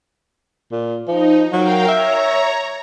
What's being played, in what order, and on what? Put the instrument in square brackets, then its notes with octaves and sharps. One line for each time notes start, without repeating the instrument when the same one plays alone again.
[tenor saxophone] A#2
[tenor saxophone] F3 [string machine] D#4
[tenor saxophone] F#3 [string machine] A#4 F5 G5
[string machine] C#5 A#5 [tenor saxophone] E5